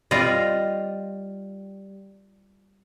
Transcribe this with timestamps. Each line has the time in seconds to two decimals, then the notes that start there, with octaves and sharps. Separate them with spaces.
0.11 G3 F4 D5 D#5